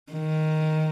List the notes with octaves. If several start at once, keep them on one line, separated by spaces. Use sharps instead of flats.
D#3